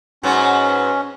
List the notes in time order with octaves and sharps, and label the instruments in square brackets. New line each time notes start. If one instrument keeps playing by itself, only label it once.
[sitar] G#2 F#3 B3 [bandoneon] C#4